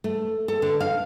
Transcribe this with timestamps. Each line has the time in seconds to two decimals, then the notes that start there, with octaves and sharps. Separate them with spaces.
0.04 A3
0.48 A4
0.62 D3
0.80 F5